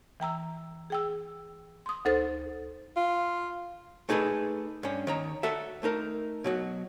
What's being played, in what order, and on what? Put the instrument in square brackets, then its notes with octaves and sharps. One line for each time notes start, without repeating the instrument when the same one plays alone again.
[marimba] E3 G5 A#5 E6
G#4 G5 E6
C6 D#6
D2 D#4 A4 C5 A6
[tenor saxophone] F4
[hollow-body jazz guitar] A3 D#4 G#4 A4 B4
G2 C#4
D#3 C#5 A#5
F#4 A4 E5
A3 D#4 A#4
B2 F#3 F#4